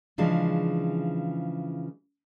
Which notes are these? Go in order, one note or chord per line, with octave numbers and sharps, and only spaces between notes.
C#3 E3 F3 G#3 D4